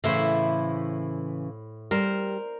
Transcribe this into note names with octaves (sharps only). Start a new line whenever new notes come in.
A2 C#3 E3 E4 C5
G3 A#4 C5